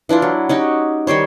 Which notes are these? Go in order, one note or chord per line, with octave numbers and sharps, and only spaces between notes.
E3 D4 E4 F4
F#3
C#4 D#4 F#4 G4
D#3 G3 C5 C#5